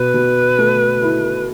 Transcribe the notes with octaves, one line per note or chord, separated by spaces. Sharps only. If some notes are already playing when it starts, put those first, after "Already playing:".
Already playing: B2 B4
B2
A3
E4